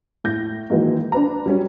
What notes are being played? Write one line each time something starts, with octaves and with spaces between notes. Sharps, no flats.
A2 G6 A#6
D#3 E3 F#3 G#3 A#3
D4 B4 A#5
F#3 G3 C#4